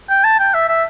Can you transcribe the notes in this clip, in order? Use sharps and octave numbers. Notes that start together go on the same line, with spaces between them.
G5
A5
G5
E5
E5